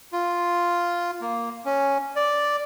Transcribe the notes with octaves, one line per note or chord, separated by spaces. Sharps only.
F4
A#3
C#4
D5